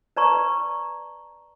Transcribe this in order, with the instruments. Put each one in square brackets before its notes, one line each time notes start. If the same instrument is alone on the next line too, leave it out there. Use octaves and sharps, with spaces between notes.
[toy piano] B4 D5 A5 A#5 C#6